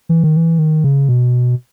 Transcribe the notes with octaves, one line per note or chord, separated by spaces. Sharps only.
E3
D#3
E3
D#3
C#3
B2